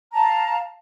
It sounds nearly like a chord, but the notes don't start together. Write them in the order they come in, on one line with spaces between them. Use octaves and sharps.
A#5 A5 F5